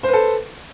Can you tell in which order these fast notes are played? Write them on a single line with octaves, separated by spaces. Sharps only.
C5 B4 A4